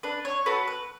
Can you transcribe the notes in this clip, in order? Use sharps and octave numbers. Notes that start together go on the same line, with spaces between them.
D4 B4
C#5
F#4 A4 B4
B4